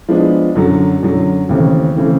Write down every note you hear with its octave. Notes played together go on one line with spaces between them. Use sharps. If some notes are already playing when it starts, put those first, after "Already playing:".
F3 G#3 B3 D4
F#2 D3 F#3
F#2 D3 F#3
D#2 C#3 E3 A3 C4
C#3 E3 A3 C4